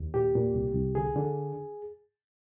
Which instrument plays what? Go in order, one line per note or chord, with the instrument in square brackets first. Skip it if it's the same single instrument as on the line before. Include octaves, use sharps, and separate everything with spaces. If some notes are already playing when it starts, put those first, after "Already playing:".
Already playing: [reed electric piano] D#2
A#2 G4
A#2
C2
C2
D3 G#4
D3